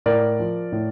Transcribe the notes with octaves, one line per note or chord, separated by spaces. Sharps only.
A2 A#4 D5
F3
A2